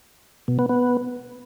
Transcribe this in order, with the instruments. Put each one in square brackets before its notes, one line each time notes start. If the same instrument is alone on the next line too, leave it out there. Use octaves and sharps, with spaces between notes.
[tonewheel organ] B2
B3
B3